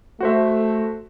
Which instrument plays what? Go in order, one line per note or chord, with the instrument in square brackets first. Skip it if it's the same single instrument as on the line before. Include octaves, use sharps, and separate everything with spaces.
[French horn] A3 [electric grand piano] F#4 C5 E5